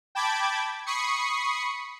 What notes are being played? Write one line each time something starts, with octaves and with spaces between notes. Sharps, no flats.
G5 A5 B5 D6 G#6
B5 C#6 D#6 C7 C#7